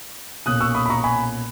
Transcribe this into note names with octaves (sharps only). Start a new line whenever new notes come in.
B1 A#2 A#3 C#4 D#6 F#6
C#6 E6
B5 D#6
B5
A#5 C#6
G#5 B5